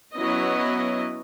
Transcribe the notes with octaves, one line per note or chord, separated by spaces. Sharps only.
F#3 B3 C#4 E4 D#5